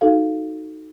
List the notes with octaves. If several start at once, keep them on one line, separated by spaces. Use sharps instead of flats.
D#4 F#4 A4 F5